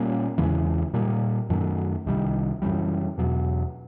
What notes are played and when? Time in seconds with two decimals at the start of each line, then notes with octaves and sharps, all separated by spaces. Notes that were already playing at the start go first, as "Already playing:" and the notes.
Already playing: A#2 G3 A#3 C#4
0.38 E2 C#3 E3 G#3
0.94 A#2 G3 A#3
1.50 F#2 D#3 F#3 A3
2.06 C2 C3 D#3 G3
2.62 F#2 C#3 E3 G3
3.18 E2 B2 F#3